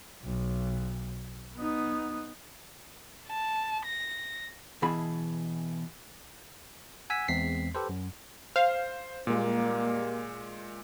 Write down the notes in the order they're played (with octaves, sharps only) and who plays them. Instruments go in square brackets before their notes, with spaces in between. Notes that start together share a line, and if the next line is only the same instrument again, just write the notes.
[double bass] B1
B3 D#4
[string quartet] A5
A#6
[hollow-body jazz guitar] B2 E3 G#4 B5
[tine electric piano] F#5 G#5 E6 B6
E2 G#3 C4 B6 C7
G4 A4 B4 C5
F#2
[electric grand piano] C5 [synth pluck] F5
[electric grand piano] A#2 G#3 [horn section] G3 A#3